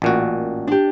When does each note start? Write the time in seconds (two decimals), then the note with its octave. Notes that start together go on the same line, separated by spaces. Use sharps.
0.02 A1 A#2 F#4
0.67 D4 G4